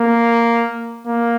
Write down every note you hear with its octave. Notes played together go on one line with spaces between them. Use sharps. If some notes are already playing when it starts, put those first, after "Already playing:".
Already playing: A#3
A#3